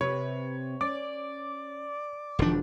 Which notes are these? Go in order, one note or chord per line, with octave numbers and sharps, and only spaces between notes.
C3 B4 C#5
C#4 D5 D6
E1 D#3 F3 D4